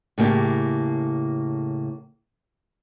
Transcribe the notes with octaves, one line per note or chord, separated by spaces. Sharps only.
A2 C#3 A#3 G4